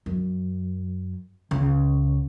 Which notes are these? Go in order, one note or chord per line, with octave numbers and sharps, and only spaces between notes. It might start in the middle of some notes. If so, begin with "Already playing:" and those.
F#2
C#2